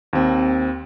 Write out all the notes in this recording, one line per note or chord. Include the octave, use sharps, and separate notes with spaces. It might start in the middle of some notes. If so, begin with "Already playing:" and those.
D#2 C4